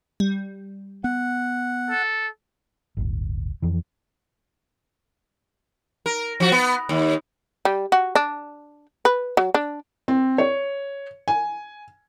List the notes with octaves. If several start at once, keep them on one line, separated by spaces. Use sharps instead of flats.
G3
B3 F#5
A4
D1 G1
F2 E3
A#4
F3 F#4
B3
D#2
G3
F#4
D4
B4
F#3
D4
C4
C#5
G#5